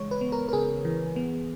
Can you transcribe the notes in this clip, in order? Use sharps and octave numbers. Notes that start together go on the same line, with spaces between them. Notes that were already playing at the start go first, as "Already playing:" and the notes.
Already playing: C#3 E3 G#3 C#5
B4
B3
A#4
A#4
C#3 G#4
E3
B3